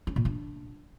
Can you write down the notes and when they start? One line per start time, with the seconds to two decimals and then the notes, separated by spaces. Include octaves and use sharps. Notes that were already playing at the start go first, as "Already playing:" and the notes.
0.07 C#4
0.16 A#2
0.25 D4